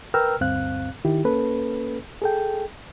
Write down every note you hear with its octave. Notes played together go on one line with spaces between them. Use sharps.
A#4 B4 G5 A#5 E6 F6
D2 G2 C4 F5 F#6
D#3 E4 G4
A#3 C#4 A4 B4
G#4 A4 G5